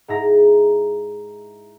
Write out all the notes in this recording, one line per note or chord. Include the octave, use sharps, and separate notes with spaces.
G#2 E4 A#5